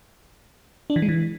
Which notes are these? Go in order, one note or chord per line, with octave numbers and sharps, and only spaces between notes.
D4
E3
G#3
E3